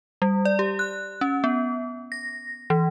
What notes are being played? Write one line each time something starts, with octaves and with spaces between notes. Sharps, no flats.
G3
D5
G4
F#6
C#4
B3
A#6
E3